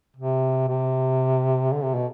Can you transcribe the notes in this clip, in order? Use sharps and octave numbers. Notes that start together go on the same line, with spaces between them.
C3
C3
D3
C3
B2